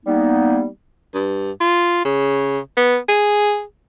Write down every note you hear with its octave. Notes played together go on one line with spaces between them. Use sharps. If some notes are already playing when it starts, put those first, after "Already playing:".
G3 A#3 B3 D#4
G2
F4
C#3
B3
G#4